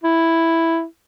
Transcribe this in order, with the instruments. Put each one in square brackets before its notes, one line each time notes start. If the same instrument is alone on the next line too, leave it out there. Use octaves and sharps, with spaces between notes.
[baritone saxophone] E4